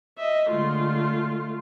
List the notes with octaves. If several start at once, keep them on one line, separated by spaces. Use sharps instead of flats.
D#5 E5
D3 G#3 A3 F4